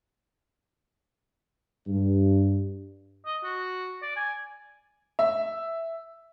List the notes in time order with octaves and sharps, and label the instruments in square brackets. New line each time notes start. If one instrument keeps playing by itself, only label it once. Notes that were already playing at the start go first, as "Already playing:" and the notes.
[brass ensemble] G2
[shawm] D#5
F#4
D5
G#5
[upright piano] E5